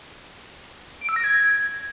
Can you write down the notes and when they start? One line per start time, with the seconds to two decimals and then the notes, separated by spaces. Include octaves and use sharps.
1.01 D7
1.09 E6
1.16 A#6
1.24 G#6